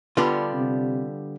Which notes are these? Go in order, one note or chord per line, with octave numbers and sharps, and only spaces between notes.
D3 G3 B3 D4 F4
C3